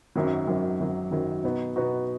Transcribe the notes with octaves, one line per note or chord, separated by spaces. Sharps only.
G#1 F#2 D#3 F#3
G#1 F#2 D#3 F#3
G#1 F#2 D#3 F#3
G#1 F#2 D#3 F#3
B2 B3 D#4 F#4
B2 B3 D#4 F#4